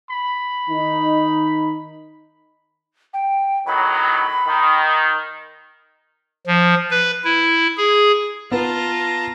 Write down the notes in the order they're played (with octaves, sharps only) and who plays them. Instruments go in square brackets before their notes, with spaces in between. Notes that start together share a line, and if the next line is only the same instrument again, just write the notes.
[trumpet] B5
[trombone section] D#3 D#4
[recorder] G5
[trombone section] A2 D#3 F#3 [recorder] B5
[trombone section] D#3
[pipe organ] F3
B4
E4
G#4
[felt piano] B3 [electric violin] F4 [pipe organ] A5 A#5 A#6